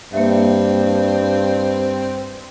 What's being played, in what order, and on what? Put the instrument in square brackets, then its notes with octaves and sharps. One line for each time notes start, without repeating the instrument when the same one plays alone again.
[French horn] G2 [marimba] A#3 E5 [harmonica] C4